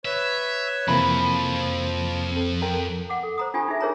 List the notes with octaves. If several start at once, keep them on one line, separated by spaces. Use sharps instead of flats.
B4 C#5 E5
F2 C3 E3 F3 A#3 B5
C4 A4
A4 A#4 G5
F#5 D6
A4
C5 A#5 D#6
D4 F4 G4 G#5
D#4 G#4 E5
G#4 A#4 C5 C#5 A5 A#5